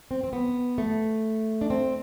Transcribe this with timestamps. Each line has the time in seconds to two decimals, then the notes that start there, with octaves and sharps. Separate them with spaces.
0.11 C4
0.24 C4
0.33 B3
0.78 A3
1.61 D4
1.70 C4